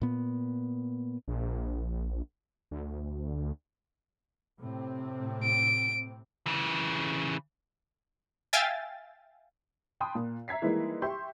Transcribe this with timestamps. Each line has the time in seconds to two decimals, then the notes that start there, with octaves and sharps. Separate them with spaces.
0.02 A#2 B3
1.28 A#1
2.71 D2
4.60 A2 C3 C4
5.43 D7
6.46 C#3 E3
8.53 E5 F5 G5 G#5 A6
10.01 G5 A5 B5 C6 D#6 F#6
10.15 A#2
10.48 E5 A#5 G#6 B6 C7
10.62 D#3 E3 G3 G#3 A#3 E4
11.02 G4 E5 C6 C#6 G6